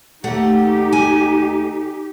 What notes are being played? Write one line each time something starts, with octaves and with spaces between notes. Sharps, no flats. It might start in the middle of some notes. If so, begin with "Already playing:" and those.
D#2 A3 D#4 G4 F#5
G#5